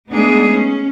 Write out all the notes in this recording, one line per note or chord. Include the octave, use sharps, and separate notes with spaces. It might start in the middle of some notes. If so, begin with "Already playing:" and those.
G#3 A3 B3 D4 D#4 G#4
C#4